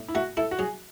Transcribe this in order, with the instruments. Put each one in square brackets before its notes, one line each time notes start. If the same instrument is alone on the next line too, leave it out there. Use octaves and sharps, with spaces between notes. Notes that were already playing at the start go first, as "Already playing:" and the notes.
Already playing: [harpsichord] A2
[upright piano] E4
[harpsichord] A3 [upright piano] F#4
[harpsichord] E4 [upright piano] A4
[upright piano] F#4
[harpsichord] F#3 [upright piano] G#4